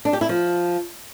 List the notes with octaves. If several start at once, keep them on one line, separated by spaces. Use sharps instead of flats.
D4
G4
E4
F3